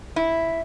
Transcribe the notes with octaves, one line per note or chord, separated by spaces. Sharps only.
E4